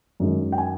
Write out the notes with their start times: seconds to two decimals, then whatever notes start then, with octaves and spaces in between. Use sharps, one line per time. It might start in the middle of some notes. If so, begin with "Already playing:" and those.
0.20 F#2 D#3 G#3
0.52 G5
0.58 G#5